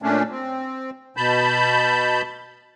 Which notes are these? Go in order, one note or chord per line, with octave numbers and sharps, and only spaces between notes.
A#2 A3 C#4 D4
C4
B2 A5 B5 G6